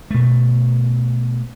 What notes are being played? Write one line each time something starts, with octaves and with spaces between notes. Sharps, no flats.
B2 A3